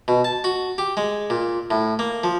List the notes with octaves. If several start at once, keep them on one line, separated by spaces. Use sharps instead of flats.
B2
A5
F#4
G4
G#3
A#2
A2
A#3
F3